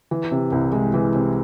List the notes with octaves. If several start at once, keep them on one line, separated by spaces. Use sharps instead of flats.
E3
C3
C2
G#3
E3
C3